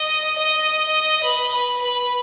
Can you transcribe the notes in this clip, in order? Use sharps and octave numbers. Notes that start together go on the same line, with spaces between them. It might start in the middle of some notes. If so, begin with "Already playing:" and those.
Already playing: D#5
D#5
B4
B4
B4